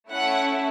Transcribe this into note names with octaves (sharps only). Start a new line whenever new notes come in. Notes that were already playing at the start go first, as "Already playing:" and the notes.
A3 C#4 E4 F#5